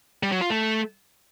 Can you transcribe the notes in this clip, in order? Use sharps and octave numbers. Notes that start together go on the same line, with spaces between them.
G3
F#3
F4
A3